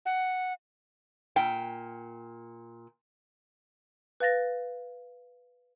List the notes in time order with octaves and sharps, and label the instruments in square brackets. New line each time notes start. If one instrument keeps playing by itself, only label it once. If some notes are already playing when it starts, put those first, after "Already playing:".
[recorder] F#5
[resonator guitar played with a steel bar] A#2 G5
[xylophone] B4 F5 A6 A#6